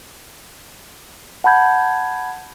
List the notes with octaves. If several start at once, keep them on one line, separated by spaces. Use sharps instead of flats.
F#5 A5 B5 G6 G#6